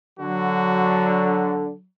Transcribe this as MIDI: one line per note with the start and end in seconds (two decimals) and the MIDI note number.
0.19 1.70 50
0.19 1.86 54
0.19 1.57 66